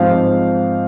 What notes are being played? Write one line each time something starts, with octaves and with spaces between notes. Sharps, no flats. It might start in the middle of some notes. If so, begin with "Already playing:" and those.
Already playing: G#2 F3 C4 F5
G#2